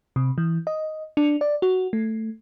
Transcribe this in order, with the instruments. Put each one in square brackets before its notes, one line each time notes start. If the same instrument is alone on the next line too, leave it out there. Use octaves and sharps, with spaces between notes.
[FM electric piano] C3
E3
D#5
D4
D5
F#4
A3